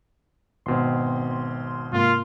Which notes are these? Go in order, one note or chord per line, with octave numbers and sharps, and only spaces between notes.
G#1 B2 C4 C6
G#2 C3 A#3 F4